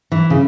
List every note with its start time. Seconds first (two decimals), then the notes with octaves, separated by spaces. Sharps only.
0.12 E3
0.30 C#3